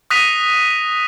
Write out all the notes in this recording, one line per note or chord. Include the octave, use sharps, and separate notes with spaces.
D#6 F#6 A#6 B6 D#7 F7